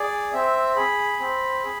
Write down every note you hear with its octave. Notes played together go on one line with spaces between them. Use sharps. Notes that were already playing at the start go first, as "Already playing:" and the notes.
Already playing: G#4 D5
C4 E5
G#4 B5
C4
G#4